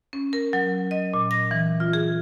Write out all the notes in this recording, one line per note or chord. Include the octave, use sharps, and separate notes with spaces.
C#4
A#4
F#3
D#5
A#2
A#6
E3
F4
G#4